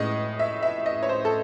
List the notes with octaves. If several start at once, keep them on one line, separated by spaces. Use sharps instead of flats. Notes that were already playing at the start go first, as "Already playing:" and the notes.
Already playing: A2 G#3 C#4 D#5
E5
E5
D#5
C#5
C5
A4